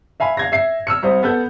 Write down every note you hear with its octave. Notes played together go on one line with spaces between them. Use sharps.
E5 F5 G#5 B5
F5 G#6 A#6
E5 C7
E6 F6 C#7
C2 C5 D#6
B3 A4 F#5 G6